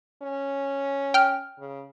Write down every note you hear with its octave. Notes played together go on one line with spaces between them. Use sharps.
C#4
G5 F6
C#3